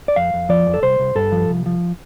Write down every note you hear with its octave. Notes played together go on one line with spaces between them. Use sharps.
D5
F2 F5
F2
F3 D5
F2
A4
C2 C5
C2
G2 A4
F3
C2
F3